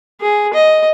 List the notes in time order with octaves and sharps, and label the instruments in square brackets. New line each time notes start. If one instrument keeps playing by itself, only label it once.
[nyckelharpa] G#4
D#5